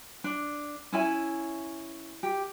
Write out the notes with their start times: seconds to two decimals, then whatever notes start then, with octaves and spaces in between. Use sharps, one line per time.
0.24 D4
0.93 C#4 E4 G#5
2.23 G4